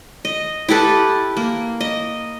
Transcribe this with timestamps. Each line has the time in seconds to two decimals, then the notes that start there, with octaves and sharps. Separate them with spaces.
0.25 D#5
0.69 E4 G4 A4 B4
1.37 A#3
1.81 D#5